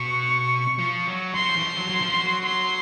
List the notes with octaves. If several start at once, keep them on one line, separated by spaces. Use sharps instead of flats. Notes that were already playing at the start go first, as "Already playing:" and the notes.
Already playing: B2 C#6
F3
F#3
F#3 C6
F3
E3
F3
F#3
F#3
F3
F#3
C6